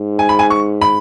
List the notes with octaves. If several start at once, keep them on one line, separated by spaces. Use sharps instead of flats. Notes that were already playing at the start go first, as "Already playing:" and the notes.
Already playing: G#2
G#5
B5
G#5
C#6
B5